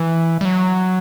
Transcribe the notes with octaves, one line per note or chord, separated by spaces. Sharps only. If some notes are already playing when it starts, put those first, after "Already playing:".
Already playing: E3
G3
F#3